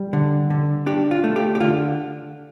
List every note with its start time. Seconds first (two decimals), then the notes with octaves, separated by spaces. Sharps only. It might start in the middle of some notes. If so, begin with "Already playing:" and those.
Already playing: G3
0.13 D3
0.50 D3
0.86 D4 G4
1.11 F4
1.24 A3
1.36 G4
1.55 G4
1.60 D3 F4